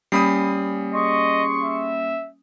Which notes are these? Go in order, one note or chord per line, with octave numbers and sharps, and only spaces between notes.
G3 A#3 C#4 B5 D#6 C7
G#4 D#5 C6 C#6
E5